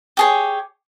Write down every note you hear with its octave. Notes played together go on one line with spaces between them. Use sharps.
G4 G#4 C#5